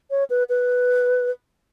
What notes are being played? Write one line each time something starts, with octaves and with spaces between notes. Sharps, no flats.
C#5
B4
B4